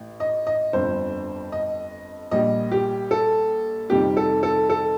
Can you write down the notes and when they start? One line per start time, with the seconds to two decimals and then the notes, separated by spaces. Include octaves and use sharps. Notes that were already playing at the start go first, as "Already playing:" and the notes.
Already playing: A1
0.20 D#5
0.47 D#5
0.73 G1 F2 D3 C5
1.52 D#5
2.31 A#1 A#2 G3 D#5
2.71 G4
3.11 A4
3.90 F2 C3 D#3 G3 G4
4.17 A4
4.43 A4
4.70 A4